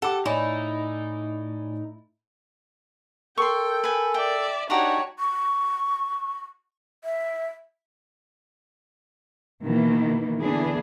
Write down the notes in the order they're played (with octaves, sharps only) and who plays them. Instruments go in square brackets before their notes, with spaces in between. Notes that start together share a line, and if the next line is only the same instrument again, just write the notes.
[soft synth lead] G4 [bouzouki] A4 [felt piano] F#5 D6
[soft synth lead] A2 [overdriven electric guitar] D#4 [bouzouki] E4 [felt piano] C#5 D5 G#5
[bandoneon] A4 [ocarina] A#4 [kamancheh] G5 [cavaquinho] C6 C#6
[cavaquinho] B4 G#5
[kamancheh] D5 E5 [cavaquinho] G5
[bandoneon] D4 D#4 [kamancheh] F#4 C#5 [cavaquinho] G4 F#5 A#5 [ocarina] C#6
[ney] C#6
E5
[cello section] B2 D#3 E3 A#3
D3 E3 B3 D4 E4 G#4